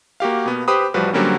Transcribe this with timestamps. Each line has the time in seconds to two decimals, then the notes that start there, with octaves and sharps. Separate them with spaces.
0.20 A#3 F#4 G4 F5
0.46 B2 B3
0.68 G4 B4 C5 B5 D#6
0.94 A1 F3 G3 F#4 B4
1.13 D3 F#3 G3 A#3 C4 C#4